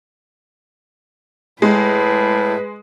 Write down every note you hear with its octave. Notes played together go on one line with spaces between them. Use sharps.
A2 G#3 B4